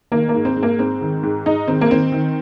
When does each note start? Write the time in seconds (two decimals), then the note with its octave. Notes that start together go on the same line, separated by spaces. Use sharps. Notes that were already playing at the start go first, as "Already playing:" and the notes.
0.12 D#3 A#3
0.29 A#3
0.34 G#2
0.45 C4
0.56 G#2
0.63 A#3
0.79 G#2 C4
1.01 D#3
1.23 G#2
1.46 G#2 D#4
1.68 D#3 C4
1.81 A#3
1.90 D#3 C4
2.12 D#3